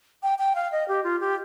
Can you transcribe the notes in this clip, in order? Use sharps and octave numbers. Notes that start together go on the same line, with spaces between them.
G5
G5
F5
D#5
G4
F4
G4